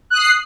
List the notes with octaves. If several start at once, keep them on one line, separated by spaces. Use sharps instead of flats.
D#6 F#6 C7